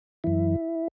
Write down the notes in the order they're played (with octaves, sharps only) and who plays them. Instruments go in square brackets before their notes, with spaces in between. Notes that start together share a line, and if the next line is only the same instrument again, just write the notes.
[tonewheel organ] F#2 E3 E4